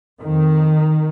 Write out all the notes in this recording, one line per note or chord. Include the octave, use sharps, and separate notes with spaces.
F2 D#3